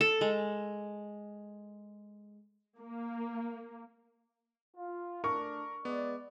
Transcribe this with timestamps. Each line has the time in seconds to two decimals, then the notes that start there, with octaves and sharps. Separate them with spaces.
0.01 A4
0.21 G#3
2.79 A#3
4.77 F4
5.24 A3 D4 A#4 C#6
5.85 G#3 B3 D5